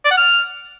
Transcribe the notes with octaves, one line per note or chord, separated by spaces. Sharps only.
D5
F#5
F6